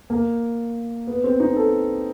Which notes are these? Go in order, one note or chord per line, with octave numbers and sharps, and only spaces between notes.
A#3
B3
C4
D#4
A4